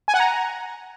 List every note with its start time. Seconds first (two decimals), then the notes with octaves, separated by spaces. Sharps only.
0.08 G#5
0.14 F#5
0.20 A#5